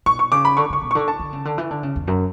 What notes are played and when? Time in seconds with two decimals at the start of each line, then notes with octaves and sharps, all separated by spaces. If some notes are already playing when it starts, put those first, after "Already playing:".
0.06 B2 C#6
0.19 C#6
0.32 C#3 D6
0.45 B5
0.57 D3 C#6
0.70 C#3 C#6
0.82 B2
0.91 D3 C#6
1.08 A5
1.19 D3
1.33 C#3
1.45 D3
1.58 E3
1.71 D3
1.83 C#3
1.96 E2
2.07 F#2